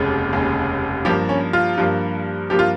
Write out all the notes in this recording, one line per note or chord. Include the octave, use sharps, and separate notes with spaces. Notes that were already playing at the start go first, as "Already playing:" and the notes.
Already playing: F1 D#2 C#3 G#3
F1 D#2 C#3 G#3
G2 F3 A#3 G4
C#4
F4
G2 F3 A#3
G2 F3 A#3 G4
F4